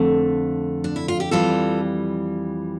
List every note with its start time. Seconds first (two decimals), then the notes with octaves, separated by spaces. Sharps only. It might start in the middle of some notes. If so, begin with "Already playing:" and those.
Already playing: F2 D3 A3
0.84 D4
0.96 E4
1.08 F4
1.20 G4
1.31 F2 E3 G3 F4 A4